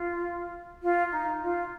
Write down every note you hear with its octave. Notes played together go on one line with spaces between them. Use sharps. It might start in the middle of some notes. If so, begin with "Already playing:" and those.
Already playing: F4
F4
D#4
F4